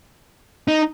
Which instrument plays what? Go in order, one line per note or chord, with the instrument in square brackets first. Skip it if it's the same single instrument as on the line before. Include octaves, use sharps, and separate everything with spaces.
[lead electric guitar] D#4